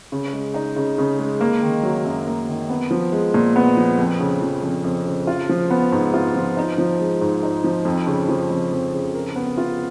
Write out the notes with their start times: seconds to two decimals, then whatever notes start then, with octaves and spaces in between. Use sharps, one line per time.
0.12 C#3
0.33 G#3
0.54 D#4
0.76 C#3
0.98 C#3
1.19 G#3
1.41 A#3
1.62 D#3
1.83 F#3
2.05 F#2
2.27 A#3
2.48 D#3
2.70 B3
2.91 F3
3.12 G#3
3.34 A#2
3.56 B3
3.77 F3
3.99 F2
4.20 C#3
4.41 F3
4.63 F2
4.84 F2
5.06 C#3
5.27 F4
5.49 F3
5.70 B3
5.92 G#2
6.14 F4
6.35 F3
6.57 D#4
6.78 F3
7.00 G#3
7.21 G#2
7.43 D#4
7.64 F3
7.85 F2
8.07 C#3
8.29 F3
8.50 F2
8.72 F2
8.94 C#3
9.14 A#4
9.36 B3
9.58 F4